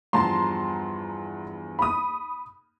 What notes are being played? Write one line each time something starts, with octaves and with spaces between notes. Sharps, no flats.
E2 G2 F3 A5 A#5 C6
B5 D#6